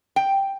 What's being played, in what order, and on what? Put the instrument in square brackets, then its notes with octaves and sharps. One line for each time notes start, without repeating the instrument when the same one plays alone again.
[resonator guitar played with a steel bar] G5